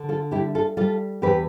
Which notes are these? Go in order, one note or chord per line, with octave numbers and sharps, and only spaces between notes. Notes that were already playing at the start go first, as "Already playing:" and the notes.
Already playing: D3
F4 A4
G3 E4 G4
F4 A4
G3 F4 A4
E2 G4 B4